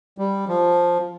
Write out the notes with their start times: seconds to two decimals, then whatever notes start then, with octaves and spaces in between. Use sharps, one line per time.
0.18 G3
0.48 F3